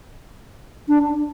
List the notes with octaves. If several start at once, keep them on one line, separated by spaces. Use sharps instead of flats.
D4